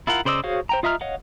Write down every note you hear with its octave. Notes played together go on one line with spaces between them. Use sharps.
E4 F4 A#4 F#5
C#3 C5 D5 D#5 E6
F#4 G#4 C5 C#5 F5
C5 G5 A#5
F4 D#5 E5 A#5 F6
C#5 D#5 F5 F#5